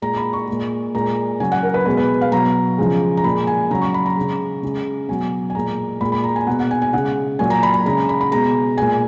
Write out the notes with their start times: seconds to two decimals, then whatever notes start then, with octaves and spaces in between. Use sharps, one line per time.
0.02 A#2 G#3 A#5
0.17 B5
0.33 C#6
0.47 A#2 G#3
0.95 A#2 G#3 A#5
1.40 C#3 F#3 G#5
1.52 F#5
1.63 A#4
1.74 B4
1.86 B2 G#3 B4
1.97 B4
2.21 F5
2.32 B2 F#3 A#5
2.78 C#3 F3 G#3
3.17 A#5
3.24 A#2 G#3 B5
3.47 G#5
3.71 C#3 F#3 A#5
3.82 C#6
3.94 B5
4.06 A#5
4.16 C#3 G#3
4.63 C#3 G#3
5.08 B2 F#3 G#5
5.50 G#5
5.55 A#2 G#3 A#5
6.01 A#2 G#3 B5
6.12 B5
6.24 A#5
6.36 G#5
6.47 B2 G#3 F#5
6.59 F#5
6.71 G#5
6.82 G#5
6.93 C#3 G#3 F#5
7.39 A#2 F#3 G#5
7.50 A#5
7.63 B5
7.74 A#5
7.85 C#3 G#3 A#5
8.09 B5
8.21 B5
8.31 B2 G#3 A#5
8.78 A#2 G#3 G#5